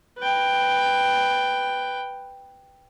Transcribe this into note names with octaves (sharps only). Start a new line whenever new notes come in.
B4 G5